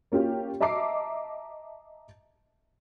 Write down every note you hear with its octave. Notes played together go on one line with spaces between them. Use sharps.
A#3 C#4 F4 G4
D#5 E5 A5 A#5 D6 C7